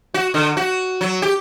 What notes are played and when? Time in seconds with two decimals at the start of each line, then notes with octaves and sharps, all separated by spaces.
0.14 F#4
0.34 D3
0.57 F#4
1.01 F#3
1.22 G4